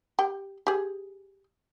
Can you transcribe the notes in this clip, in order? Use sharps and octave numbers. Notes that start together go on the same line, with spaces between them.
G4 G5
G4 G#4